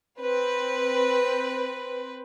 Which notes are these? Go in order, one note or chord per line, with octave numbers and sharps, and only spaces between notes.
C4 B4